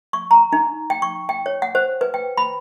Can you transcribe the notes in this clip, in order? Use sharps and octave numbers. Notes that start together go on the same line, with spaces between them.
C#6
A#5
D#4
G5
C#6
G5
C#5
F#5
C5
B4
G5
B5